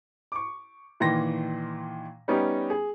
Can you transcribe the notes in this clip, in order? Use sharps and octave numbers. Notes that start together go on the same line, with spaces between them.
C#6 D6
A#2 D#3 E3 C6 A#6
G3 B3 C#4 D#4 G4
G#4